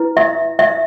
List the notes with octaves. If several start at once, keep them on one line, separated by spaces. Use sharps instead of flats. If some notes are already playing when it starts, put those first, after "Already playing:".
Already playing: E4 B4
E5
E5